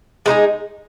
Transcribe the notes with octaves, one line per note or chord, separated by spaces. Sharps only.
G#3 B3 D#4 G#4